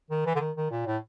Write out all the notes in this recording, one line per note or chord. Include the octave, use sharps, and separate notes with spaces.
D#3
E3
D3
D#3
D#3
A#2
A2